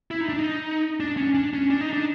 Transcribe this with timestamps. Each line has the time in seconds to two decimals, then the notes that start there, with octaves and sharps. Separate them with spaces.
0.11 E4
0.21 D#4
0.29 D4
0.39 D#4
1.00 D4
1.17 C#4
1.34 D4
1.53 C#4
1.70 D4
1.81 D#4
1.93 D4